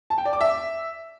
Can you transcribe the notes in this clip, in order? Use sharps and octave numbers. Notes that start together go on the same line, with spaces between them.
A5
G5
D5
D6
E5